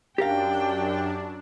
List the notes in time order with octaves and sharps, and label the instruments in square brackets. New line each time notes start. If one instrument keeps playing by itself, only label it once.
[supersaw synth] F#2 D4 [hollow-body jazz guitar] G4 A#4 F5 [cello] G5